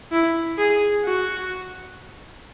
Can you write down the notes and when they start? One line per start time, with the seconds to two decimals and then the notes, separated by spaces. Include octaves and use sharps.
0.12 E4
0.58 G#4
1.04 F#4